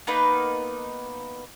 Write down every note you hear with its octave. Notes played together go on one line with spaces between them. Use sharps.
A#3 B3 D#4 B4